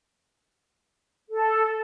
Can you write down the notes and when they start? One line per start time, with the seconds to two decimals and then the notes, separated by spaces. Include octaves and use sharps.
1.31 A4